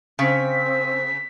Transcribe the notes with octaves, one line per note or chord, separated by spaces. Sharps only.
C#3 C4 B6